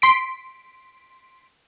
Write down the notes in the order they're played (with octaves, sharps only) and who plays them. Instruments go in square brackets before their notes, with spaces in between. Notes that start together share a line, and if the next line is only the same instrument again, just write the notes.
[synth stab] C6 B6 D7